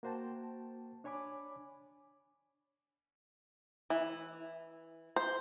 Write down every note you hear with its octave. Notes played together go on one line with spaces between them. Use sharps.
A#3 F#4 C5 G5 A5
D4 C#5 G#5 B5 D6
E3
C5